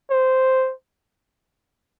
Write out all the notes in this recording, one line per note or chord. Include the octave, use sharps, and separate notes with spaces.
C5